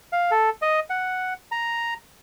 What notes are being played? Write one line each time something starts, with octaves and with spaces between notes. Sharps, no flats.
F5
A4
D#5
F#5
A#5